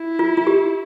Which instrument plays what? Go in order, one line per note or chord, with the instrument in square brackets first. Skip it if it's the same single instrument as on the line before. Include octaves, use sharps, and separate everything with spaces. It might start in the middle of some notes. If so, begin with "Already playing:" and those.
Already playing: [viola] E4
[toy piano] F4
F4
G4